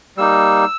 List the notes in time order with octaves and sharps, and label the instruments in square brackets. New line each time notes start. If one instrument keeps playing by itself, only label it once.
[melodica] G3 A#3 D#4 E6